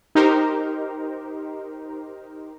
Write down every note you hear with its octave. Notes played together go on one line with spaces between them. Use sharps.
D#4 G4 A#4 C5